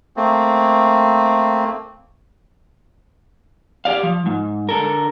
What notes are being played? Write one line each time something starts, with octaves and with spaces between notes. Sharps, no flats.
A3 A#3 C4
G4 D5 F5
F3
G#2
D3 A4 A#4